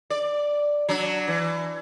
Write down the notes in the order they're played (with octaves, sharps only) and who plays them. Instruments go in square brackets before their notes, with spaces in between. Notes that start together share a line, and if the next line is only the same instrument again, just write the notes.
[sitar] D5
F#3 D4
E3